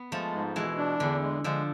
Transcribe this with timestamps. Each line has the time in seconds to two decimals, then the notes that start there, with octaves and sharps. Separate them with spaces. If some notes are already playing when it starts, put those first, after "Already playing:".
Already playing: B3
0.12 F3 G#3 A3
0.34 G#2
0.56 B2 E3 G#3
0.78 D4
1.00 E2 D3
1.22 G#3
1.44 D3 F3 G#3